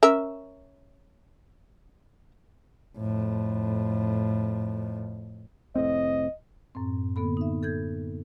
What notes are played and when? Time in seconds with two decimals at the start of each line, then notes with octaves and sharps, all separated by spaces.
0.03 C#4 A#4 E5
2.97 F2 A2
5.76 F1 A2 C4 D#5
6.75 F#2 A2 C4
7.16 D3 A#3 B3 A4 B5
7.37 D#4 E5
7.63 A4 G6 G#6